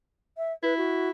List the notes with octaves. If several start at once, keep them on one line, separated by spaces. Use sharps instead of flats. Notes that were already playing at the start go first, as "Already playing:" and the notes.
E5
E4 B4
F#4